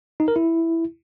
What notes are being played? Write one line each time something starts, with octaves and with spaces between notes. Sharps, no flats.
D#4
A#4
E4